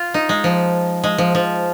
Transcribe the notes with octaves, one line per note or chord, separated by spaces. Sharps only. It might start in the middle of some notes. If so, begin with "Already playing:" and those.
Already playing: F4
D#4
G#3
F3
G#3
F3
F3